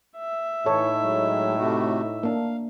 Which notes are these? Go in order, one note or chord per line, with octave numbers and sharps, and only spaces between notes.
E5
A2 E3 D#4 A4 C#5
F#3 G#3
C3 A3 F#4
A#3 D4 F5